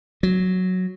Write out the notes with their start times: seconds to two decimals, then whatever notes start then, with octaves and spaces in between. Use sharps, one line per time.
0.23 F#3